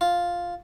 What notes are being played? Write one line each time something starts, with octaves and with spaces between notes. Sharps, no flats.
F4